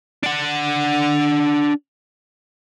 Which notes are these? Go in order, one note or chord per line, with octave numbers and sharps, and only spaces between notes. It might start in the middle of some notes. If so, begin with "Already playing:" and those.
D4 F#5